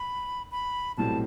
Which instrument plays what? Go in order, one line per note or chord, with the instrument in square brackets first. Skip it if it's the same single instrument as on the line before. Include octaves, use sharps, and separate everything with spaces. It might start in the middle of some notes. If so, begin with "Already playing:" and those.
Already playing: [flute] B5
B5
[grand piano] B1 A2 G3 C4 [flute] A5